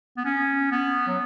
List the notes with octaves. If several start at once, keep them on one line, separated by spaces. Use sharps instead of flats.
B3
C#4
B3
F#3